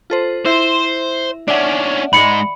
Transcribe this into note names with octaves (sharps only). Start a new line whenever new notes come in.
F4 A4 C5
E4 C5 E5
C#4 D4 D5 E5 F#5
G#2 G#3 B5 C#7